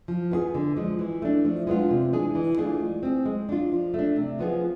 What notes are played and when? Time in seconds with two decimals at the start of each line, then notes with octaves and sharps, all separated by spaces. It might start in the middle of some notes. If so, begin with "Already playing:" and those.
0.08 F3
0.31 B3 F4 G#4
0.55 D3
0.77 F3 G#3
0.99 E3
1.22 A3 D4
1.45 F3
1.67 G#3 B3 D4 F4
1.91 C3
2.13 E3 G#3 D4 G#4
2.35 E3
2.58 A3 D4 F4 G#4
2.81 G#3
3.03 C4 G#4
3.26 G#3
3.49 D4 F4
3.72 F3
3.94 A3 D4
4.16 C3
4.39 F3 B3 F4 G#4